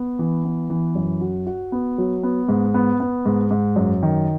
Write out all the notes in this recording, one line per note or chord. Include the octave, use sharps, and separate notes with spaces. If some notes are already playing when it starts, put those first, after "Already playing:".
Already playing: B3
E3
B3
E3
F#2
F#4
F#4
B3
F#3
B3
G#2
B3
B3
G#2
G#2
F#2
D#3